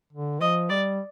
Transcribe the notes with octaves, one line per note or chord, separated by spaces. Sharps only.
D3
F3 D#5
G3 D5